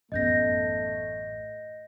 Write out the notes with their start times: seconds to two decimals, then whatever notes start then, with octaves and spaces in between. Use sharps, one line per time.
0.12 A1 F#2 A3 B3 D#5 G6 A#6